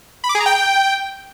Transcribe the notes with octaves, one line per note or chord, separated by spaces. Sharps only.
B5
D6
G#4
A#5
G5